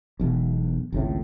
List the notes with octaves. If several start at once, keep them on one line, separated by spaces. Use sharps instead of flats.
E1 B1
G#1 C#2 A2